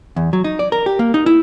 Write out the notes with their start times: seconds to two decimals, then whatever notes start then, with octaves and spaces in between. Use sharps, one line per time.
0.16 E2
0.33 F#3
0.44 D#4
0.59 D5
0.72 A#4
0.86 G4
0.99 A#3
1.14 D#4
1.26 E4